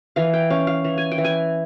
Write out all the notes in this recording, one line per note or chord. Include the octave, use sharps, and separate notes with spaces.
E3 F5
G5
C#4 F5
F5
E3
G#5
G5
E3
G#5